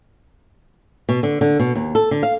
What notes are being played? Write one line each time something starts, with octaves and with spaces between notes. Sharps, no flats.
B2
D3
D3
B2
D#2
A4
D3
F5